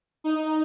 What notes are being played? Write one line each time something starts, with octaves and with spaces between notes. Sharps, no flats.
D#4